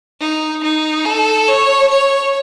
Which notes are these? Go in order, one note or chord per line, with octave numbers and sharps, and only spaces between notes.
D#4
D#4
A4
C#5
C#5